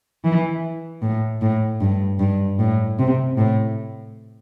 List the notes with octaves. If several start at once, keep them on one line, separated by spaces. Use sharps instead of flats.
E3
A2
A2
G2
G2
A2
C3
A2